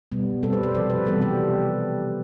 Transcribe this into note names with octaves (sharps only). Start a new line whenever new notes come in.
B2 G3 B3
B2 G3 C4 A4
B4
C5
C3 F3 C4 D5
B4
C3 E3 G3 B3 A4
G4